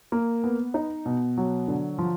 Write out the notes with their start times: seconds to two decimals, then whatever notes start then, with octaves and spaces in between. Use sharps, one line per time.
0.12 A#3
0.44 B3
0.74 D#4
1.06 B2
1.37 F#3
1.68 D3
1.98 F3